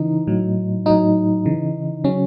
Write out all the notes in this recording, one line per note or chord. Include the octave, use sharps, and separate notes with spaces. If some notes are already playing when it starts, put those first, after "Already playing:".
Already playing: C#3 E3 D#4
A2 F#3
A2 F#3 D#4
C#3 E3
C#3 F#3 C#4